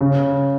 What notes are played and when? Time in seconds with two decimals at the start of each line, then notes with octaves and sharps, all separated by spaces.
0.01 C#3